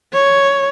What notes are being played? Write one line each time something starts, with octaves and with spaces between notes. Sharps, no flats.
C#5